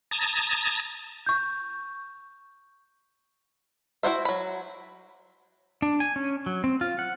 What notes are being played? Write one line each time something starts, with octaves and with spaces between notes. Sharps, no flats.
A5 A#5 D#6 G#6 A6
C#6 G6
E4 F#4 C5 E5
F#3 B5
D4
G#5
C#4
F#3
C4
F4
F#5